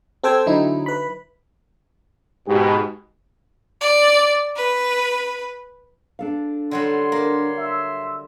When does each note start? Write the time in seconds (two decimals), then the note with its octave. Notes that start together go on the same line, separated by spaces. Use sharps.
0.23 C4 A4 C5 G5 E6 G#6
0.46 D3 F#3 D#4 E4
0.86 B4 B5
2.48 G#2 B2 G4
3.81 D5
4.56 B4
6.19 D4 A4 F5
6.71 D3 F#3 G3 C#5 F#5 C6
7.12 A#3
7.57 E5